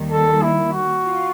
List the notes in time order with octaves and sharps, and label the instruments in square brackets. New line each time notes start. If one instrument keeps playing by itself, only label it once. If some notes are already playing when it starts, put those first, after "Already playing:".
Already playing: [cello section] D#2 D#3 G3
[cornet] A4
E4
F#4
[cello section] F4